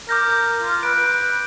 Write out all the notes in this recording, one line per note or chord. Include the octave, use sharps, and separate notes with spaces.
A#4 D6 G6 A#6
F4
B4 D7